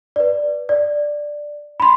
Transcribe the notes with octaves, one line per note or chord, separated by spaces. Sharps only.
B4 D5
D5
B5 C6